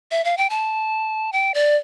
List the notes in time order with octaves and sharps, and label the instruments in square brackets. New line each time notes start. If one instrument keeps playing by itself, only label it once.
[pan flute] E5
F5
G5
A5
G5
D5